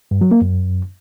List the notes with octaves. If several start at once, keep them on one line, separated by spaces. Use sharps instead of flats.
G2
F#3
A#3
F#2